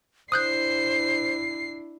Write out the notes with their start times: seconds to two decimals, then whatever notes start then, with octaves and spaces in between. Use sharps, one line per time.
0.32 D4 E4 C5 D#6 F#6 G6 C7